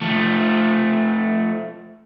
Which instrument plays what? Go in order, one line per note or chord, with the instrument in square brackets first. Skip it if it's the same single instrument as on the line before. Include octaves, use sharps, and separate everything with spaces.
[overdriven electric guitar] F3 A3